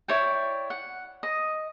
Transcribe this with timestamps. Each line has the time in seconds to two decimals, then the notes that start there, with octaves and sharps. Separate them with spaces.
0.08 E4 C#5 D5 G5
0.70 F#5
1.23 D#5